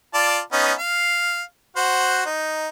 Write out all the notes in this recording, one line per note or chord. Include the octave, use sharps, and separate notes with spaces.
F4 D5 A5
B3 C#4 D#4
F5
F#4 C5 F#5
D#4